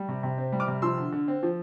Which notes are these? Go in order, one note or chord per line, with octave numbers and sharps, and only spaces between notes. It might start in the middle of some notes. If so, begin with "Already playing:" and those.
Already playing: G3
C3
C3
C4
G3
D6 F6
C3
F3 C6 E6
D3
D3
C4
F3